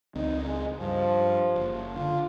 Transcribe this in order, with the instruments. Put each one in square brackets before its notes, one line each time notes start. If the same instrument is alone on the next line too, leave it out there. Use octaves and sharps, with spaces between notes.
[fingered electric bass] C#2 C4 [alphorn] D#4
[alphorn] G#3
[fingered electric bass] G2 [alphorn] F3
[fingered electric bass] F#1
[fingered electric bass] D3 [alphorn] F4